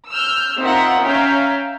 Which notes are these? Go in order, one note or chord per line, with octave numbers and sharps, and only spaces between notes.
E6 F6 G6
C4 D#4 F4 A#4 E5 F#5
C#4 E5 F5 G5 A#5